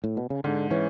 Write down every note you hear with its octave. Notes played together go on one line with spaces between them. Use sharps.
A2
B2
C#3
G#2 D3
E3 C#4